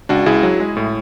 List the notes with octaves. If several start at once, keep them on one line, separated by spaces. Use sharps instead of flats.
C#2 D4 F#4
C#2 E4 G#4
F#3
G#3
A2